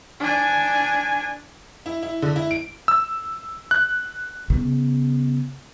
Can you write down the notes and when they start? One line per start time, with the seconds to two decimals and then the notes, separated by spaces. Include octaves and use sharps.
0.20 D4 G#5
1.86 E4
2.03 E4
2.22 D3
2.36 E4
2.51 D7
2.88 E6
3.71 F#6
4.50 C#3 B3